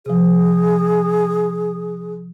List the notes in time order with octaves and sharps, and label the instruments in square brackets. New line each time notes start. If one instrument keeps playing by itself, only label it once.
[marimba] C3 F3 [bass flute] G#4